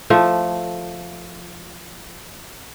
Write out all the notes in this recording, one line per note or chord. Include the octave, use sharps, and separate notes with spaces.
F3 A3